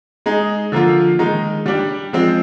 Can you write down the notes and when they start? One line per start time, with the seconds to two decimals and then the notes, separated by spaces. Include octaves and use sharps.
0.26 G#3 D#4 G#4
0.72 D3 F3 A#3 F4
1.19 D#3 G#3 D#4
1.66 G3 D4 G4
2.13 F3 G#3 C4